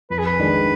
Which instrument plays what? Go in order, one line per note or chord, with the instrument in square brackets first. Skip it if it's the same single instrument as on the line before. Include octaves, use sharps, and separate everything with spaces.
[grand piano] F2 [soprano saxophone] B4
[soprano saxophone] G#4
B4
[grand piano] D#3 G#3 D4 G#4